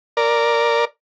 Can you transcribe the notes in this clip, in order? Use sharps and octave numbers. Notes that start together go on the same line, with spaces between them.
A#4 D5